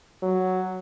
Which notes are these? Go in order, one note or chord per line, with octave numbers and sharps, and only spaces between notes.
F#3